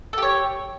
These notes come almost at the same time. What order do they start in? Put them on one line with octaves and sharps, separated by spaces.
A4 G4 C#5